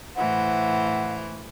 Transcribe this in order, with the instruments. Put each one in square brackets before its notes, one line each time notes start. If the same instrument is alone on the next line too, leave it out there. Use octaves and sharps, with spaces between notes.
[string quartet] A2 E3 C5 [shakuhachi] F#5